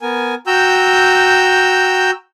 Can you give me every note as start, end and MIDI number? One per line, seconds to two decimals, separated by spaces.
0.01 0.35 59
0.01 0.35 70
0.01 0.35 80
0.47 2.11 66
0.47 2.11 79
0.47 2.11 82
0.47 2.11 88
0.47 2.11 91